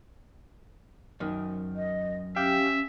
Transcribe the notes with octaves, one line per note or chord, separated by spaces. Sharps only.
F#2 D#3
D#5
C#4 G4 E5 F5 G5